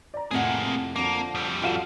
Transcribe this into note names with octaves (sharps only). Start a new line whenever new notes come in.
D5 A#5
F2 A2 C3 A#3 G#4 F#5
D3 F3 A#3
F2 G3
F4 F#4 A4 D5 F5 E7